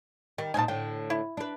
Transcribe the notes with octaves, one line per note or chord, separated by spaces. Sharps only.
D#3 G3
A#2 C4 D#4 G#5 A5
A2 D3 G5
E4
D4 B4